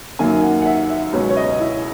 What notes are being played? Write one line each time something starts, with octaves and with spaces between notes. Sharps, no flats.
F#2 D#3 F#3 A#3 G#5
F#5
F#5
E5
E5
C#2 B2 F#3 C#4
C#5
D#5
E4